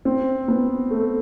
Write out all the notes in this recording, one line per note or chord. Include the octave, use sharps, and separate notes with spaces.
C4
B3
A3